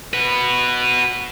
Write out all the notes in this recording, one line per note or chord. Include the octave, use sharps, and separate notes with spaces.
F#4 B4